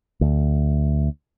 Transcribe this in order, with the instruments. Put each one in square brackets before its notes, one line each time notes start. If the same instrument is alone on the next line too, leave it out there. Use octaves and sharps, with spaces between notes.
[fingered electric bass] D2